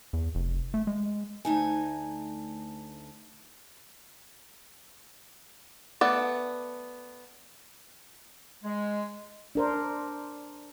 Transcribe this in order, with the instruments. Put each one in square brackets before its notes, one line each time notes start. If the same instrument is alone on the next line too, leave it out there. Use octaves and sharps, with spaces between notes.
[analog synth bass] E2
F1
A3
G#3
[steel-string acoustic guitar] D2 A3 D#4 G#5
[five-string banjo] A3 B3 D5
[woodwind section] G#3
[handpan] D4 A#4 C5